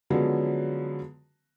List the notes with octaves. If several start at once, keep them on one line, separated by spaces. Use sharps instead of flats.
D3 F3 F#3 G#3 B3 C#4